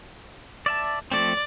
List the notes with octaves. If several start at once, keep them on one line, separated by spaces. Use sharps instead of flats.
D5 E5 A5
F3 A3 C4 D5